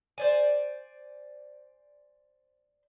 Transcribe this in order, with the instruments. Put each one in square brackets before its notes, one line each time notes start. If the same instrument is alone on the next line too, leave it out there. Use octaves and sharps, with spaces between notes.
[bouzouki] C5 D5 G#5